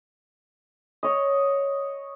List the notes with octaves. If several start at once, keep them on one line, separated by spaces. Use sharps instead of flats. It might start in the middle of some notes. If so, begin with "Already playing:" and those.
C#5 D#5